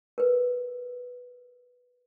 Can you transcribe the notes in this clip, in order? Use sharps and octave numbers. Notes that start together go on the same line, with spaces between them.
A#4 B4